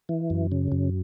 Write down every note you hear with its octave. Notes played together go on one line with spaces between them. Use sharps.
E3
F#2
C#3
F#2